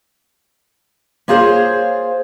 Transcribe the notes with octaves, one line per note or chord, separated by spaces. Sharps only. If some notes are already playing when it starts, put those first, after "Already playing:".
A#3 F4 G#4 C5 C#5